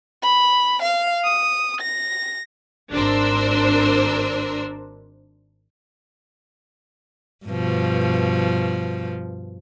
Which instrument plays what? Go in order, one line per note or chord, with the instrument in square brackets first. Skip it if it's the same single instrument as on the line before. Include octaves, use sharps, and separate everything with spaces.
[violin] B5
F5
D#6
A#6
[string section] G#1 D4 A#4 C5 E6
[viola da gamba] G2 B2 F3